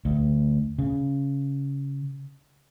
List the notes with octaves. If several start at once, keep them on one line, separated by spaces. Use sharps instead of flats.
D2
C#3